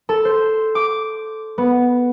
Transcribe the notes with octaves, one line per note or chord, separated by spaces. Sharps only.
A4
C5
D6
B3